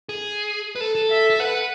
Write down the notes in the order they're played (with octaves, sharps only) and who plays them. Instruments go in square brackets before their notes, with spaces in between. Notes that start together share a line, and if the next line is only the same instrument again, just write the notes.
[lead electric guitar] G#4
B4
A4
A4
[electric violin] E5
[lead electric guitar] A4
[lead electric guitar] B4 [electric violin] F#5